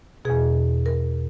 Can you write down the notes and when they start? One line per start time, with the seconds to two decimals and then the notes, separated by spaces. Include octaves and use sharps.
0.25 E2 B2 G#4
0.86 A#4